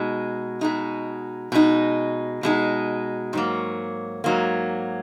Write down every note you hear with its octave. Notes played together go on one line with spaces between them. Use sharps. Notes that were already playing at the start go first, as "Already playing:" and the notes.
Already playing: B2 G#3 D#4
B2 G#3 D#4
B2 G#3 D#4
B2 G#3 D#4
G#2 F#3 A#3
G#2 F#3 A#3